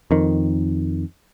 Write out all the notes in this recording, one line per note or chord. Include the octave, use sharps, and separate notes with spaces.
F2 D#3